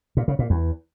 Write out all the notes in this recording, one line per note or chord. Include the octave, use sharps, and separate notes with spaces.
A#2
C#3
A#2
E2